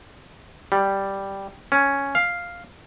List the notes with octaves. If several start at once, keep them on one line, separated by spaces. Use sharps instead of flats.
G3
C#4
F5